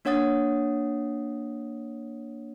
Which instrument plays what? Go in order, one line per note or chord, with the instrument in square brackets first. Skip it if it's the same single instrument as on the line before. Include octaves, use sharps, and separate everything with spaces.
[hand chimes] A#3 D4 C#5 F#5 D#6 A6